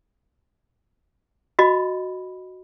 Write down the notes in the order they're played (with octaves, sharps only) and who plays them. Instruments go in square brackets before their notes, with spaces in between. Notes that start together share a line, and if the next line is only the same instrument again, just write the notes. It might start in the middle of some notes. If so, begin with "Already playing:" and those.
[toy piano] F#4 D#5 B5